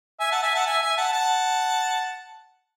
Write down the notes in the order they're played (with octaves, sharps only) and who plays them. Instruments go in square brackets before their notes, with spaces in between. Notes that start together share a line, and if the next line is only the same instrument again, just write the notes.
[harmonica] E5 G#5
F#5 A5
E5 G#5
F#5 A5
E5 G#5
E5 G#5
F#5 A5
F#5 A5